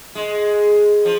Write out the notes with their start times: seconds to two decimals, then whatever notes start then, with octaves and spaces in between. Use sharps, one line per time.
0.15 G#3
1.05 F3